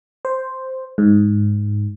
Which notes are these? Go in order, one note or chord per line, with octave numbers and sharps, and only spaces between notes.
C5
G#2